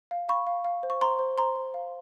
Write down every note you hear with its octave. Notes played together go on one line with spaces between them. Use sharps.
F5
F5 B5 C#6
F5
F5
C5
C#6
C5 A#5 C6
C5
C5 A#5 C6
C5
F5